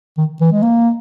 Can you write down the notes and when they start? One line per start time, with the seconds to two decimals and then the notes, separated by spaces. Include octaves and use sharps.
0.17 D#3
0.41 E3
0.52 G#3
0.63 A#3